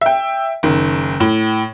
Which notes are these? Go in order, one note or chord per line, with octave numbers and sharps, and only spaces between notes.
E5 G5
F#1 D#3
A2